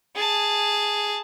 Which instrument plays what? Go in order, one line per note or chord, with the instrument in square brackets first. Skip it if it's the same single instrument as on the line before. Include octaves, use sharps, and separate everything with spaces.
[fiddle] G#4 A5